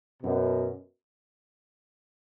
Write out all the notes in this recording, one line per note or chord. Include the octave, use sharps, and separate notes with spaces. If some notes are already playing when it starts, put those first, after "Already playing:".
F#2 B2